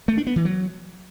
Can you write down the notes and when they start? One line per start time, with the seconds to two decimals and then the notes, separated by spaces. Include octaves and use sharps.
0.08 A3
0.17 D4
0.27 B3
0.36 E3
0.45 F#3